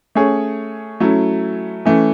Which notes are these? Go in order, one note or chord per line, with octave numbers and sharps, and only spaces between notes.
A3 C#4 G#4 C#5
F#3 A3 C#4 E4
E3 A3 C#4